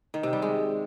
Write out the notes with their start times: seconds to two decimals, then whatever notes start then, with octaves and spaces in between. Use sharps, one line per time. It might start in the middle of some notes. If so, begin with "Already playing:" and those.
0.14 D#3
0.23 C3
0.33 G3
0.42 G#3